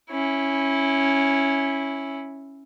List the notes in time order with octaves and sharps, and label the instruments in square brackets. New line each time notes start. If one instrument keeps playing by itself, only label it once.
[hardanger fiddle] C#4 E4